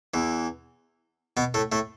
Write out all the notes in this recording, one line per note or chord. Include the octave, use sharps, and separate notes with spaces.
E2 E3
B2 B3
A2 A3
A2 A3